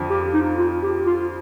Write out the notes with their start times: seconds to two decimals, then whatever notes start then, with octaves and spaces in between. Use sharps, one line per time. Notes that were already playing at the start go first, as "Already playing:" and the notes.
Already playing: F2 D3 F3
0.10 G4
0.34 D#4
0.59 F4
0.83 G4
1.07 F4